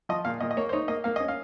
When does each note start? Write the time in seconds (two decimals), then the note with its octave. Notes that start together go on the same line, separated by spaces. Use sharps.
0.09 F3 D#5
0.25 A#2 F5
0.40 A#2 D#5
0.51 D#5
0.57 A#3 C#5
0.69 C5
0.73 D#4 C#5
0.88 A#3 D#5
1.04 A#3 F5
1.16 C#4 D#5
1.28 F5